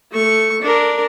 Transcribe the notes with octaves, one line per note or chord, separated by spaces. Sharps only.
A3 C#6
D4 A#4